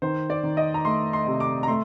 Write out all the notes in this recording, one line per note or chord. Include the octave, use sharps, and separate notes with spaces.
D#3 C5
D5
D#3
D#5
A#5
A3 C6
C6
C3
D6
A#5
A3 C6